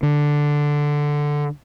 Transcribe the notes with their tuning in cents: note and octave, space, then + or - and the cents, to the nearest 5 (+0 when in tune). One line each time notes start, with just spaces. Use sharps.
D3 +0